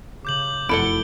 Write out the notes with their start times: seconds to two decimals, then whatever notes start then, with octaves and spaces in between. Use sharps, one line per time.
0.25 C#3 D6 G6 F#7
0.69 F1 F#2 E4 A4 F#5 D7 G7